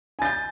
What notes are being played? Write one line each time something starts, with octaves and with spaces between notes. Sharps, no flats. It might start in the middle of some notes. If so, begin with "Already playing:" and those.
G#5 G6 A6